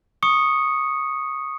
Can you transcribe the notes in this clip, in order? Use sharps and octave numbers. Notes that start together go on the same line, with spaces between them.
C#6 D#6 C#7